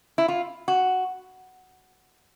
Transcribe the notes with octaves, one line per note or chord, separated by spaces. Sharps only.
E4
F4
F#4